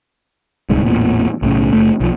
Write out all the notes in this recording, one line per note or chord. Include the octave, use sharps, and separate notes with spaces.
D1 C2 G#2
A1 E2 A#2
B1 A2 C#3
F#1 A3
B1 F3